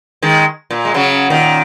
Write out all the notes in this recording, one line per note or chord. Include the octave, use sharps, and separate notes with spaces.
D#3 G#3
A#2
G#3
C#3 F#3
A#2 D#3